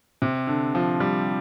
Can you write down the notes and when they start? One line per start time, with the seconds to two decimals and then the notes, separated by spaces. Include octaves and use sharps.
0.22 C3
0.47 D3
0.75 F3
1.00 G3